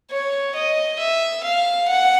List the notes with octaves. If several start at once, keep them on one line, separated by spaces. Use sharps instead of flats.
C#5
D#5
E5
F5
F#5